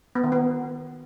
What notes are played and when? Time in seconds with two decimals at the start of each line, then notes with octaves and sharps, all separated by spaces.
0.15 B3
0.24 D#3
0.32 B3